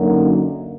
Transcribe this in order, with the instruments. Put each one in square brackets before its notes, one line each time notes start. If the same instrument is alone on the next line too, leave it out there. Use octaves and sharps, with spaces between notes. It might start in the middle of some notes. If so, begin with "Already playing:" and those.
Already playing: [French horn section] F#2 D3 F#3 A#3 D#4